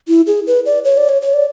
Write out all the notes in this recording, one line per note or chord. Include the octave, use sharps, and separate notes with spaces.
E4
G#4
B4
D5
C#5
D5
C#5
C#5
D5